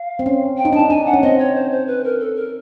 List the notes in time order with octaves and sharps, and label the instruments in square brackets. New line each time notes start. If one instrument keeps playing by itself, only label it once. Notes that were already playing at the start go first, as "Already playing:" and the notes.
Already playing: [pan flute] F5
[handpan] C4
C#4
[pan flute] G5
[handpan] D#4
[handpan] D4 [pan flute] A5
[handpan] D#4
[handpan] D4 [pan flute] G#5
[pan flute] F#5
[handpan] C#4
[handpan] C4 [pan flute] D#5
[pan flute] C#5
C5
C5
B4
A#4
A4
A#4